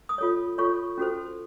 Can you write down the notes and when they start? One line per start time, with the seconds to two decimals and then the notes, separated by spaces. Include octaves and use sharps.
0.09 D#6
0.18 F4 A4 C#5
0.58 F4 A4 C#5 C#6
0.98 C#4 F#4 A4 C5